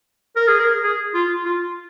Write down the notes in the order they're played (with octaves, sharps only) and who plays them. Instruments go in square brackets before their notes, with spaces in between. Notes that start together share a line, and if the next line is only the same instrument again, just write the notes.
[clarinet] A#4
G#4
A#4
G#4
F4
F4